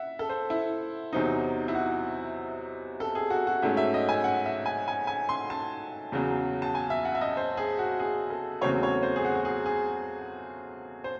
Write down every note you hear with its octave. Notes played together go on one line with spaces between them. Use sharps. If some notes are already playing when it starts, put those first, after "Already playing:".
Already playing: E5 F#5
A4
C5
E4
E2 C3 F#3 C4 D#4
E4
F#4
A4
G#4
F#4
F#4
G#2 F#3 A3 C#4 E5
E5
D#5
G#5
F#5
E5
G#5
G#5
G#5
C6
A5
E2 C#3 F#3
A5
G#5
E5
F#5
E5
D#5
C5
G#4
F#4
G#4
A4
E2 C#3 F#3 A3 C4 C#5
C#5
C5
G#4
F#4
F#4
G#4
G#4
C5